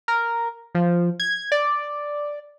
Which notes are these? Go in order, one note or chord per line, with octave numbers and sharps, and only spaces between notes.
A#4
F3
G#6
D5